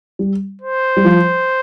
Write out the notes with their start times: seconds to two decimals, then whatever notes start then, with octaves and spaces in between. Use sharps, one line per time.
0.19 G3
0.62 C5
0.97 G3
1.05 F3